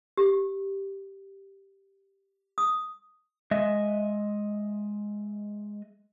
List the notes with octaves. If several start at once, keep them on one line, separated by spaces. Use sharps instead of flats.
G4
D#6
G#3 D#5 E5